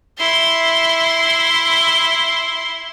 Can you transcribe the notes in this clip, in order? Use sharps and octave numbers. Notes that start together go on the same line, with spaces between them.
E4 C6